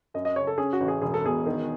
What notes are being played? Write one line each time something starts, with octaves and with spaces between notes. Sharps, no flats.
F#2 D#5
D#5
C#3 C#5
A4
C#4 G#4
F#4
A1
G#4
E1 G#4
A4
B2 G#4
D#3